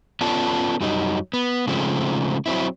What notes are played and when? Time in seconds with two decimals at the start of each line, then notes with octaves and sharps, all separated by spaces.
0.21 B3 C#4 F4 A4 D5 A5
0.81 F#2 F#3 G3 D#4
1.33 B3
1.67 C#3 F3 G#3 A3 C4
2.46 F#3 C4 E4